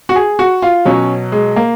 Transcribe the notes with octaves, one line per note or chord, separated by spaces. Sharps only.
F#4
G#4
F#4
F4
B2 F#3 C#4
G#3
A#3